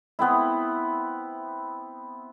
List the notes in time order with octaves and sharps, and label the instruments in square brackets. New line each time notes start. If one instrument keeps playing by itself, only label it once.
[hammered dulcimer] B3 C4 E4